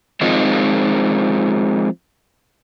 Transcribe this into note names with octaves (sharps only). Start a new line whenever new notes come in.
F3 G#3 C4 D#4 F4